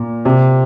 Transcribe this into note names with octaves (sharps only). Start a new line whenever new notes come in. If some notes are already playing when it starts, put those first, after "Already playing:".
Already playing: A#2
C3